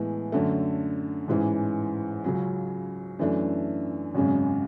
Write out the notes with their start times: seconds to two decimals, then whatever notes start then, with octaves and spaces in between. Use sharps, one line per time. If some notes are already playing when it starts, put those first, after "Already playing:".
Already playing: A2 E3 G#3 B3
0.32 F#2 D3 A3
1.28 A1 G#2 E3 G#3
2.24 C#2 C#3 F#3
3.19 F#2 E3 A3 D4
4.14 G#1 F#2 C#3 G#3